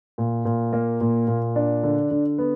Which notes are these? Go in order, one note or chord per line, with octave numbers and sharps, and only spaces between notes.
A#2
A#2
A#3
A#2
A#2
D4
D3
D3
B3